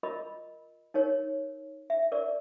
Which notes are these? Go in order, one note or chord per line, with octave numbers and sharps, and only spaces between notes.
F4 A#4 D#5 B5
D#4 A#4 C#5
E5
A#4 D5